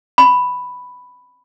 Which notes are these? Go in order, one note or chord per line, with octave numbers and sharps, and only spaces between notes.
B5